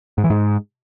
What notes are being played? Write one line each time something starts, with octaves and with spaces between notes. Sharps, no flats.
G#2
E3
G#2